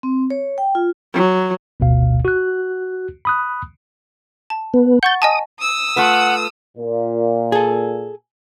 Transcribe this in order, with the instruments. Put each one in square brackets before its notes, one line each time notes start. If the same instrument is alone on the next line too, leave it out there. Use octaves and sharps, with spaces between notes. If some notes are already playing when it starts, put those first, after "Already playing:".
[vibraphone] C4
C#5
G5
F4
[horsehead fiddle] F#3
[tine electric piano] G1 D2 B2 F5
F#4 F#6
B5 D#6 F#6
[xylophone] A5
[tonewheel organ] B3
[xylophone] F#5 C#6 A6 [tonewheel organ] G6
[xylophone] D#5 G#5 A5 [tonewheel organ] D#6
[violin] D#6 E6
[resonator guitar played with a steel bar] A3 F4 B4 [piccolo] F#5
[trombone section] A#2
[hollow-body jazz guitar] G#4 A4